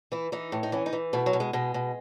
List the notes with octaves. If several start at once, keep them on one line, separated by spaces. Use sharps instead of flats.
E3 E4
E3 D#4
A2
D#4
E3 C#4
D#4
E3
B2 A3
F#3
B2
G#3
B2 G#3
B2